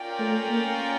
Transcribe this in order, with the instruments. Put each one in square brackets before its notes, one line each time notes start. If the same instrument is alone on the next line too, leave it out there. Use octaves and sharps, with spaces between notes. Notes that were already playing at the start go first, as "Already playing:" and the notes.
Already playing: [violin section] C#4 F4 A#4 D5 G5
[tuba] A3
A#3